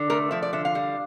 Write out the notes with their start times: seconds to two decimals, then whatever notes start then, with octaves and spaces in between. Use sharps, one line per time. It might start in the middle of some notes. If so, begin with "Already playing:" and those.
Already playing: D3
0.10 A3 A#4
0.31 F3 E5
0.43 D5
0.53 D3 E5
0.65 F5
0.75 G3